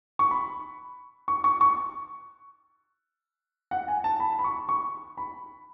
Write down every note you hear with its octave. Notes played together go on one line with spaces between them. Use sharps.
C#6
B5
C#6
C#6
C#6
F#5
G#5
A5
B5
B5
C#6
C#6
B5